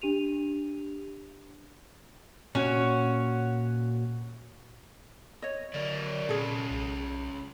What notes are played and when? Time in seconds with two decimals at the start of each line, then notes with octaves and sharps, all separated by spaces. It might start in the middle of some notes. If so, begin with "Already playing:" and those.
0.02 D4 G4 D#7 F7
2.55 A#2 C#4 F#4 C#5
5.42 C#5 D#5
5.74 D3 F#3 A#4 D5
6.29 A#2 C#4 F4 G#4 A4
6.70 B1